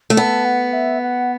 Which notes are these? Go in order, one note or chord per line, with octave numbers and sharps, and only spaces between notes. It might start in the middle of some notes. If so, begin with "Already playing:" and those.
A3
B3 A5
F#5
E5
F#5